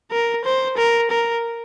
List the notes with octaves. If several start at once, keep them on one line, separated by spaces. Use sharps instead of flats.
A#4
C5
A#4
A#4